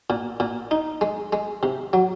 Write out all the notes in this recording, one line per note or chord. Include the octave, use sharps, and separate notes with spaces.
A#2
A#2
D#4
G#3
G#3
C3
F#3